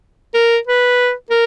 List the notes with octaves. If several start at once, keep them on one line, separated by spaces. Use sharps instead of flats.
A#4
B4
A#4